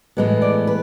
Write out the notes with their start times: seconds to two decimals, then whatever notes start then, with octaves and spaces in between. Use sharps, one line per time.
0.17 A2 E3 G#3 B3
0.42 D5
0.67 B4